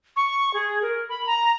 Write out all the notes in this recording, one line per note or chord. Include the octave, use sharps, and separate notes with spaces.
C#6
G#4
A#4
B5
A#5